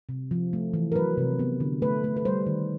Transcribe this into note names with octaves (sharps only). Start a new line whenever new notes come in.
C3
F3
A3
E3
A#4
F#3 B4
C3
B3
D3
A3 B4
A3
B4
G3 C5
D#3